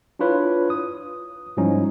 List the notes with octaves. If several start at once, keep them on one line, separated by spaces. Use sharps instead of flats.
D4 E4 F4 B4 C#5
D#6
G#2 F3 G3 C#4 D#4 E4